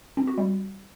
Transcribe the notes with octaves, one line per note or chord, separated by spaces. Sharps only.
C4
F#4
G3